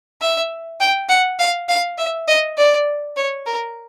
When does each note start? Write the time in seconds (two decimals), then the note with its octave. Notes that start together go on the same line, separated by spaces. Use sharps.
0.21 E5
0.80 G5
1.09 F#5
1.39 F5
1.69 F5
1.98 E5
2.28 D#5
2.58 D5
3.17 C#5
3.47 A#4